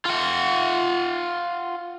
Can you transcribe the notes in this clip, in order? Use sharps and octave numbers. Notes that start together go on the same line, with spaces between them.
F4 F#5